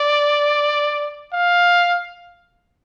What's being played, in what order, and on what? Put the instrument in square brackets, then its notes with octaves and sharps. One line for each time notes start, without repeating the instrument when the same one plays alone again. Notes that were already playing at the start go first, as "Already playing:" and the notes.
Already playing: [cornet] D5
F5